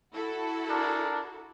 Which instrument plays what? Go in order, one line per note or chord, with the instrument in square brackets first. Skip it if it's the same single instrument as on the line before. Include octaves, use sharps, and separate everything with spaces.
[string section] E4 F#4 A4
[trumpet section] D4 G#4 A#4